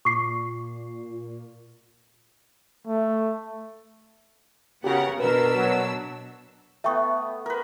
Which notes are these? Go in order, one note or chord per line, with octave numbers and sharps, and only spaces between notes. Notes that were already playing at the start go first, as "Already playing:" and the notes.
A#2 C#6 D6 C7
A3
C#3 B3 F#4 G4 A#4 F#5
B2 D4 A#4 B4 E6
F#3
A3 B3 E5 G5 C#6
A#4 B4